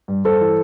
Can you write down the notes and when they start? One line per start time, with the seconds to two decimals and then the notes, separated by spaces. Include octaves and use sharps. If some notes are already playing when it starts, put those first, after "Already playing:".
0.08 G2
0.25 G2 A4 C5
0.41 E3